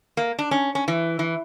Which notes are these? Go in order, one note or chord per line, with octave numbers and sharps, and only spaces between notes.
A#3
D4
C#4
C#4
E3
E3